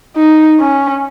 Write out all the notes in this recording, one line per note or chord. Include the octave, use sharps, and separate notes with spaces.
D#4
C#4